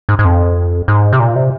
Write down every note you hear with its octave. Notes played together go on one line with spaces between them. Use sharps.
G#2
G#2
F2
G#2
C3
A#2
C3